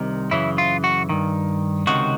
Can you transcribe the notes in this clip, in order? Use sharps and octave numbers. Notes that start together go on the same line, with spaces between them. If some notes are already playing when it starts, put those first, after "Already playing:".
Already playing: C2 C3 D#3
F#2 C#3 E3 E4
F4
F#4
G2 D#3
C#2 C3 D#3 F#4